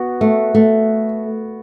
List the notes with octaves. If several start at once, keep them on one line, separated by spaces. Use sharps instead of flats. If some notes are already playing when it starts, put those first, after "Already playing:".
Already playing: B3 F#4
A3
A3